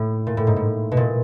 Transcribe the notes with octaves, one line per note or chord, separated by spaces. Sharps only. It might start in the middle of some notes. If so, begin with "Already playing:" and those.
Already playing: A2
A#2
A2
G#2
A2
B2
A#2